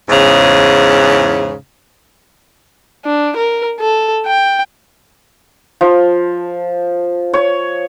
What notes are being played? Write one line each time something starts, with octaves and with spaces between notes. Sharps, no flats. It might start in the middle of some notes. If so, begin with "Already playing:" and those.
E2 G#2 C#3
D4
A#4
A4
G5
F3
C#5